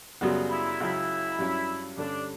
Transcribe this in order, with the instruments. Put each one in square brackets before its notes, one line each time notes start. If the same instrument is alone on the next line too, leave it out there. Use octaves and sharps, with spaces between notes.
[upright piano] F#2 C#3 G3 B3 F#4
[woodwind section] E4
[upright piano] C#2 C#3 F#3 [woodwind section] E4
[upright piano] G2 F#3 C#4
[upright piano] G2 D3 G3 C#4 [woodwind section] D4